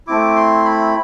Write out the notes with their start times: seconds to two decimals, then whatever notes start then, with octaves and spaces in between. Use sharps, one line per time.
0.07 A3 C4 E4 D6
0.36 C6
0.65 B5